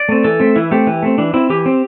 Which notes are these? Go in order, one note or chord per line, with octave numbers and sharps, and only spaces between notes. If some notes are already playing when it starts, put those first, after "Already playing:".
Already playing: D5
A3 C4
E3 A4
A3 C4
E3 E4
A3 C4 G4
E3
A3 C4
E3 D4
C4 E4
E3 G4
C4